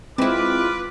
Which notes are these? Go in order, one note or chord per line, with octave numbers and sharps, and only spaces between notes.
G#3 C4 E4 F4 B4 D6